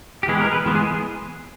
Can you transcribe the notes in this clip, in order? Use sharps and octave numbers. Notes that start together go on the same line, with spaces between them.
G4
E3 G#3 B3 G#4
A#4
B4
E3 G#3 B3
G#4